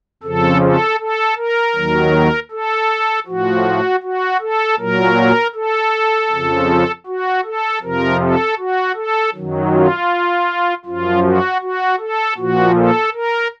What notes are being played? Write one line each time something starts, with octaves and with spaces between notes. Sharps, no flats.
F2 C#3 F3 A4
A4
A4
A#4
D#2 D#3 F#3
A4
A2 F3 F#4
F#4
A4
A#2 F#3 A#4
A4
F2 C#3 F3
F#4
A4
F2 C3 F3 A#4
A4
F#4
A4
F#2 D#3 F#3
F4
F#2 F3 F4
F#4
F#4
A4
A#2 F3 F#4
A4
A#4